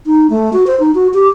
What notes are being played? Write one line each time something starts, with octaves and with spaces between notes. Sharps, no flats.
D#4
A3
F#4
C5
D#4
F#4
G4